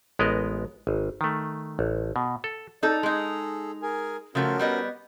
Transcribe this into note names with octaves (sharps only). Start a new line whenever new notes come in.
A1 G#3 B3 A#4 D#5
G#1
D#3 A3
A1
B2
A4
D#4 A4 D5
G#3 D#4 G#4 A4
G#4 A#4 G#5
C#3 F3 A3 C#4 F#4 A#4
G3 B3 D#5